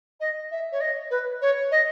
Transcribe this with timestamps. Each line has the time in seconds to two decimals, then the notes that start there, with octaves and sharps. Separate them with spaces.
0.20 D#5
0.51 E5
0.72 C#5
0.81 D#5
1.10 B4
1.42 C#5
1.71 D#5